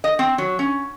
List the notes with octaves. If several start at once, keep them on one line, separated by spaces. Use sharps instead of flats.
D#5
C4
F#3
C#4